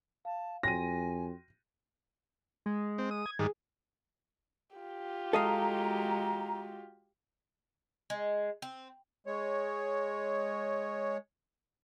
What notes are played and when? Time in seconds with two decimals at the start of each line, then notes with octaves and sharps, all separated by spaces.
0.25 F5 A5
0.63 F2 F#4 G5 G#5 C6 A#6 D#7
2.66 G#3
2.98 C4
3.11 D#6
3.26 G#6
3.39 G#2 D#3 G3 G#4
4.76 F4 G4
5.33 G#3 F#4 A4 D#5 F5 A#5
8.10 G#3
8.62 C4
9.27 G#3 C#5